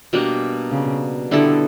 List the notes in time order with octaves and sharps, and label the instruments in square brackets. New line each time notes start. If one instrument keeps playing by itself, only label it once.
[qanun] B2 G3 A#3 D4
[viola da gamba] C#3
[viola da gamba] D3 [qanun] G3 B3 E4 A4